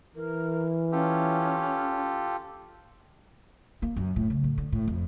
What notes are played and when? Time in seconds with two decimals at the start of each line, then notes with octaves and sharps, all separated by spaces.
0.16 E3 A#4
0.92 C#4 F4 G4 A4
3.82 A#3
3.96 F#2
4.16 A2
4.30 C#3
4.44 A2
4.58 D3
4.72 A2
4.88 F2